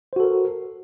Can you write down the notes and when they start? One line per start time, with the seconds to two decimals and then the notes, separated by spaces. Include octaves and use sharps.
0.13 C5
0.16 F#4
0.20 A4
0.24 A#4